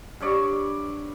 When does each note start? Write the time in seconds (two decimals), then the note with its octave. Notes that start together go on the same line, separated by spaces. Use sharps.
0.21 G2 C#5 D5 C#6